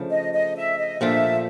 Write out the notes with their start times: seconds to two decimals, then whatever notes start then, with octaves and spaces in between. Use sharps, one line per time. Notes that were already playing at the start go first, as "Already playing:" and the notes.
Already playing: C#3 F3 A3 D4
0.10 D#5
0.33 D#5
0.56 E5
0.78 D#5
1.01 A#2 F3 A3 D4 E5